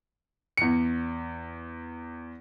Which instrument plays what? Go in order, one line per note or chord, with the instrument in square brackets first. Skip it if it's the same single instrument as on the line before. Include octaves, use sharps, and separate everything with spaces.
[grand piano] E2 C#7